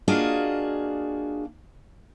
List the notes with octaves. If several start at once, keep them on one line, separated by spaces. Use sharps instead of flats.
A#3 D4 F4 F#4 G#4 D#5